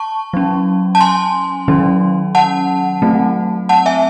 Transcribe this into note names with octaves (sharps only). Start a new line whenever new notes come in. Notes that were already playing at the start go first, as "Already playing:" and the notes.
Already playing: A5 C#6
F#3 C#4
A5
G#5 C6
D#3 F#3 C#4
F#5 A5
F#3 A3 C4
F#5 A5
E5 G#5